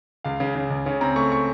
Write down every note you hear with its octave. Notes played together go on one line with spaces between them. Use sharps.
C#2 F5
C#3
C#3
C#2
C#3 C#5
C4 A#5
A3 C#6
C#6